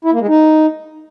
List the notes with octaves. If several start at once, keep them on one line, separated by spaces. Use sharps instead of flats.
E4
A#3
G#3
D#4